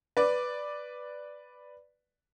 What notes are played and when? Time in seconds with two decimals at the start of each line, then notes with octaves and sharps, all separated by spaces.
0.17 B4 D5